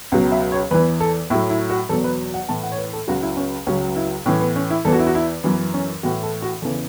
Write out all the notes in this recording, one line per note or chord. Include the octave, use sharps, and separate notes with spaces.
C#2 B2 F#3 B4
E5
C#5
E2 E3 B4
A4
A2 F#3 E4
E4
F#4
E2 B2 F#3 A4
B4
F#5
A2 E3 A5
F#5
C#5
B4
A4
C#2 C#3 F#3 F#4
E4
C#4
C#2 C#3 F#3 C#4
E4
A2 E3 C#4
B3
C#4
E4
E2 E3 A4
F#4
E4
F#4
E4
F#2 E3 B3
C#4
A2 E3 F#4
A4
F#4
E2 C#3 E3 A4